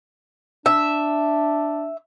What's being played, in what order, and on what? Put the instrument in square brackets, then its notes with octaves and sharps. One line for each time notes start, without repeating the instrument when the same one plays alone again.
[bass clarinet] D4 [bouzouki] E5